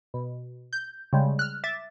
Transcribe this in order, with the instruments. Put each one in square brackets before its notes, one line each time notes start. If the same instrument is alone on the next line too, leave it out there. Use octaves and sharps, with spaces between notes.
[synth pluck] B2
G6
C#3 G3 G#3
F6 F#6
E5 D6 A6